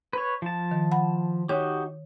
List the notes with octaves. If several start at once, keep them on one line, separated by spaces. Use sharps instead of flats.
B4 C#5
F3 A5
D#3
F#5 B5
D#4 F#4 G4 C#5